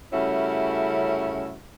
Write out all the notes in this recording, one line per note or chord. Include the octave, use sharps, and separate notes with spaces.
C#3 G3 A3 C#4 E4 F#4